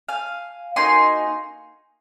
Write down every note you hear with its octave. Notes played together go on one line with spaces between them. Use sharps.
F5 G#5
A#3 D#4 F#4 G#5 C6